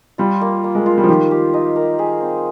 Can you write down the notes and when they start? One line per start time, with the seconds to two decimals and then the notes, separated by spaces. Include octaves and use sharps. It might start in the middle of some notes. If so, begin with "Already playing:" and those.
0.18 G3 F4
0.41 A#3
0.64 A#3
0.75 G#3
0.86 F4
0.98 G3
1.04 F3
1.09 D#3 G4
1.31 G4
1.54 D#4
1.76 A#4
1.99 G#4
2.21 C4